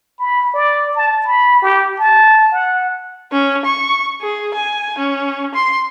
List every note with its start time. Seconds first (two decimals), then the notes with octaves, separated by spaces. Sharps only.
0.19 B5
0.54 D5
0.96 A5
1.26 B5
1.63 G4
1.99 A5
2.52 F#5
3.32 C#4
3.65 C#6
4.22 G#4
4.54 G#5
4.98 C#4
5.54 C6